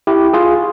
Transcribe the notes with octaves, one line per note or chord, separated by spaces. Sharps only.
E4 G4
F4 G#4